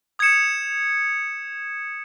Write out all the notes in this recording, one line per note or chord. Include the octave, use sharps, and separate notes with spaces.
D#6 G#6 C#7 E7